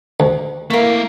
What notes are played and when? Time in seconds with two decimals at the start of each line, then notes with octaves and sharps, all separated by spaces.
0.20 D2
0.70 A3 A#3 E4 A#4 F5